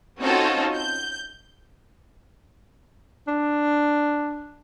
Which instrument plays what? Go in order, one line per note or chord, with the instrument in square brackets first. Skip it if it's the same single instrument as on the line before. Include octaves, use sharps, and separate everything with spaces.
[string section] C4 C#4 D#4 F4 F#4 A4
G6
[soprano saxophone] D4